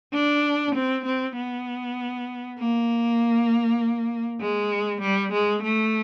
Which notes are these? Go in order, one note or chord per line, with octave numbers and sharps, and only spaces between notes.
D4
C4
C4
B3
A#3
G#3
G3
G#3
A3